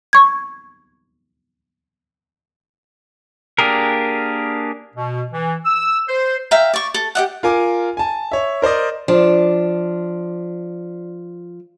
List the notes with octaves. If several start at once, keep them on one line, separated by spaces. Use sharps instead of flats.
C#6 G#6
A#3 D4 G4 G#4 A#4
B2
E3
E6
C5
E5 F5 G5 A#5
D5 C#6
A4
G4 D#5 F#5
F4 A#4 G#5 D6
G#5 A5
C#5 E5
A#4 C5 D5 D#5
F3 D4